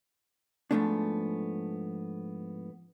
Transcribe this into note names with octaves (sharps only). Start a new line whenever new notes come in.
G#2 D#3 F3 A3 B3 D4